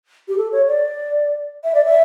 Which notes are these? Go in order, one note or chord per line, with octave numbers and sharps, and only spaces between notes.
G4
A4
C#5
D5
E5
D5
E5